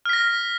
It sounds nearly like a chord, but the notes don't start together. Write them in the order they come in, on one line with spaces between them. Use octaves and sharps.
F6 B6 A#6